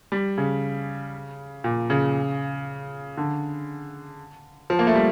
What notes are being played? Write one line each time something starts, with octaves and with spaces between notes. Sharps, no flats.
G3
C#3
A#2
C#3
D3
F3
A#3
A3
G3